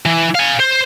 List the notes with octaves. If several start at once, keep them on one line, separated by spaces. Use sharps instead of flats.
E3
F5 G#5
C5